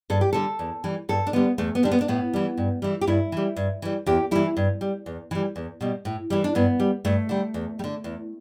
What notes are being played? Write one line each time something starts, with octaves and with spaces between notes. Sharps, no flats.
G2 A4
G4
D3 G3 A4
E2
E3 G3
G2 A4
D4
D3 G3 B3
E2 A3
B3
D3 G3 D4
B3
D4
A2 B3
E3 G3
G2
E3 G3
G4
G2 E4
E3 G3
G2
E3 G3
E2 G4
E3 G3 E4
G2
G3
E2
E3 G3
E2
B2 G3
A2
E3 G3
D4
G2 B3
G3
G2 A3
D3 G3
E2
G3
D3
E2